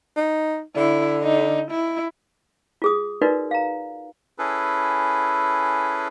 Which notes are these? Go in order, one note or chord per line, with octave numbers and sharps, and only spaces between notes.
D#4
D3 E4
D#4
E4
F4 G#4 D#6
D#4 F4 F#4 A#4 B4 D5
F5 A#5
C#4 E4 G#4 A4 B4